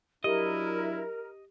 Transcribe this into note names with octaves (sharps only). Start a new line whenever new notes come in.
F#3 D4 E4 G4 A#4 D#5